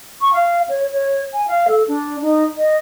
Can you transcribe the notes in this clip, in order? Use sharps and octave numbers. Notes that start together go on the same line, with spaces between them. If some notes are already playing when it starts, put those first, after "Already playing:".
C#6
F5
C#5
C#5
G#5
F5
A4
D4
D#4
D#5